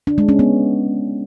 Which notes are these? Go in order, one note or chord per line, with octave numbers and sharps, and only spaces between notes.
D4
G#3
C#4
B3